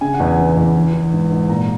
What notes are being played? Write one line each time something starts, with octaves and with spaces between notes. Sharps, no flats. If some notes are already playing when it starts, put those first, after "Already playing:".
C#3 G#5
F#5
E2
G#5
E3
E2
E3
E3
G#2
G#2
A#2 A#5